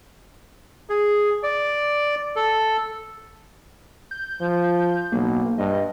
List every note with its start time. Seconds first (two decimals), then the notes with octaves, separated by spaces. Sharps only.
0.89 G#4
1.43 D5
2.36 A4
4.11 G6
4.41 F3
5.12 B1 A#3
5.58 G2 D#5